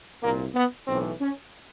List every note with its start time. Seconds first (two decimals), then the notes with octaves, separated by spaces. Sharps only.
0.21 C2 A#2 A#3
0.54 B3
0.87 B1 A2 E3 C4
1.20 C#4